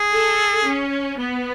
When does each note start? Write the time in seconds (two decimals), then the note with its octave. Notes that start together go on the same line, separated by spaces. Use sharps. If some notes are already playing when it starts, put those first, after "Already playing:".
Already playing: G#4
0.13 A4
0.66 C#4
1.20 B3